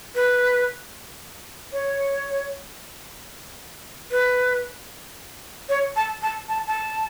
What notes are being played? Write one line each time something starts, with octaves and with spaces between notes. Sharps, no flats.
B4
C#5
B4
C#5
A5
A5
A5
A5